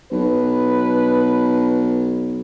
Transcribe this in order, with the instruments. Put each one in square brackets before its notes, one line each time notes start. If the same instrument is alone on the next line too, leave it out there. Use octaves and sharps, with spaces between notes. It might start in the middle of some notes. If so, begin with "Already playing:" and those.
[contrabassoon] B1 [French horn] B4